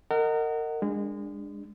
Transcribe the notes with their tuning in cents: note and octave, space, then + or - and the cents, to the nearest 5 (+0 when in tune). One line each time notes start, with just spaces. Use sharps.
A#4 -30 D#5 +0 F#5 +10
G#3 -25 D4 +0